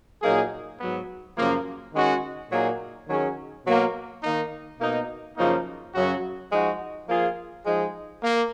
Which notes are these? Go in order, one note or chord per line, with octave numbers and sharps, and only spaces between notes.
A#2 F#3 A#3 D#4 G#4
G#2 F#3 B3
F#2 C#3 F3 A#3
D#3 G#3 C#4 F#4
A#2 F#3 A#3 D#4 G#4
D#3 F#3 C#4 G#4
B2 F#3 A#3
D#3 A#3 D#4
B2 A#3 D#4
F#2 C#3 F3 A#3 D#4
F#2 C#3 F#3 C#4 F#4
F3 G#3 D#4 F#4
F3 A#3 F4 G#4
F3 G#3 D#4 G#4
A#3